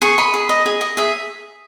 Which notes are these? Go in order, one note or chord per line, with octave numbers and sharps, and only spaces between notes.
G#4 C#6
D#5 B5
G#4
D#5
G#4
D#5
G#4 E5